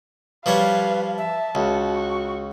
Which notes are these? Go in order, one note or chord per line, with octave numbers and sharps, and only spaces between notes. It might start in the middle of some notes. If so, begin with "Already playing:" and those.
F3 G3 B4 C#5 F5
E5 A5
C#2 F#4
C#6